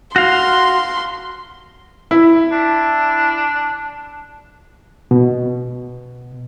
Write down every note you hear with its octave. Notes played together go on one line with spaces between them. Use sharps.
F#4 F5 C6
E4
D4
B2